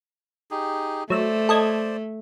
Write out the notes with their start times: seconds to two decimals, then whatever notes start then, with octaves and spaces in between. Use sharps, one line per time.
0.51 D#4 G4 G#4
1.10 F#3 A3 C5 D5 E6
1.49 A4 D#5 G#6